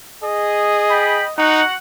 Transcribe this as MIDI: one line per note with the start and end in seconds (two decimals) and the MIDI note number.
0.24 1.22 68
0.24 1.35 75
0.89 1.26 79
0.89 1.26 83
1.38 1.63 63
1.38 1.74 66
1.38 1.74 78